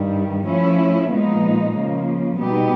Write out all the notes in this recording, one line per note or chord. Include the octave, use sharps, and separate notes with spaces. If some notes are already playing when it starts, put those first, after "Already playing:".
Already playing: G2 D#3 G3
F3 A3 C#4 E4
A#2 F3 G#3 B3 D#4
C#3 F3 A#3
B2 G3 B3 D#4 G4